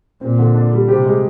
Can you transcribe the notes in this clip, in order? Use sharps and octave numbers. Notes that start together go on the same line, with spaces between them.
A#2 C4
D3
D4
G3
C3 G4
G#3